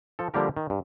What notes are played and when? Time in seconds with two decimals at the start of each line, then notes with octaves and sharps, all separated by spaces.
0.19 F3 A4
0.34 D3 F3 G3 A#3 G4 A#4
0.57 D#3
0.70 G2